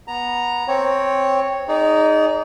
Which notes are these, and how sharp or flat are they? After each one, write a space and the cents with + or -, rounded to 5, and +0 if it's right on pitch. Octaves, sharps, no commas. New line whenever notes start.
B3 -15 A#5 +0
C4 +10 C#5 +0
D#4 +0 G#4 +0 D5 -40